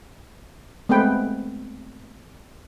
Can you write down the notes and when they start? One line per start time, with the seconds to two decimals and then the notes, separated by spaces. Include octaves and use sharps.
0.89 G#3 A3 B3 C4 B4 G5